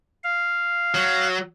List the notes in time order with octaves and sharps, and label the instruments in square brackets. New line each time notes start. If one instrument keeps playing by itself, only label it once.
[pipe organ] F5
[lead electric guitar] F#3